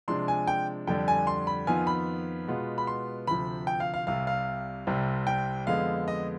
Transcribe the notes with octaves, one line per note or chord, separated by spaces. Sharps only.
C3 F3 G#3 D4 C6
G#5
G5
F2 D3 G3 D4 G5
G#5
C6
B5
F2 D#3 B3 F4 G#5
B5
B2 G#3 B3 F4
B5
C6
D2 C3 F3 B5
G5
F5
F5
C2 C3 G3 F5
F5
C2 C3 G3 C4
G5
F2 D3 G#3 B3 F5
D#5